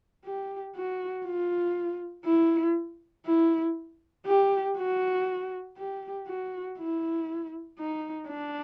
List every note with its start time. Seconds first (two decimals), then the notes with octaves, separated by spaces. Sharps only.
0.25 G4
0.76 F#4
1.26 F4
2.25 E4
3.26 E4
4.26 G4
4.77 F#4
5.78 G4
6.27 F#4
6.78 E4
7.79 D#4
8.28 D4